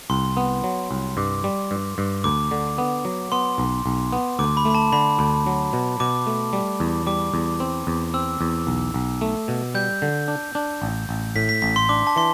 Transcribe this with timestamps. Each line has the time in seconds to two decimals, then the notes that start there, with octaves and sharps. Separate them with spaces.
0.10 C2 C6
0.37 B3
0.64 F#3
0.91 C2
1.17 G2 D6
1.44 G3
1.71 G2
1.98 G2
2.24 D2 D6
2.51 D3
2.78 B3
3.05 F#3
3.32 B3 C6
3.58 B1
3.86 B1
4.13 B3
4.39 D2 D6
4.57 B5
4.65 A3
4.70 B5
4.75 A5
4.92 D3 B5
5.19 D2
5.47 F#3
5.73 B2
6.00 B2 D6
6.27 A3
6.53 G3
6.80 E2
7.07 G3 D6
7.34 E2
7.60 C4
7.87 E2
8.14 C4 E6
8.41 E2
8.67 B1
8.94 B1
9.21 A3
9.48 B2
9.75 G3 G6
10.02 D3
10.28 D4
10.55 D4
10.82 A1
11.09 A1
11.36 A2 B6
11.49 B6
11.62 A1 B6
11.76 C6
11.89 D4 D6
12.07 A5
12.16 E3 C6